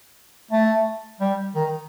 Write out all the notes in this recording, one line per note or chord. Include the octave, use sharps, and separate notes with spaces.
A3
G3
D#3